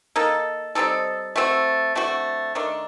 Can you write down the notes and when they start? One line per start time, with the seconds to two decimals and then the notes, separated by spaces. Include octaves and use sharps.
0.16 A#3 D#4 A4
0.75 G3 C4 D#4 A4
1.36 A3 C4 F#4
1.95 D3 A3 C4 F#4
2.55 D#3 A3 D4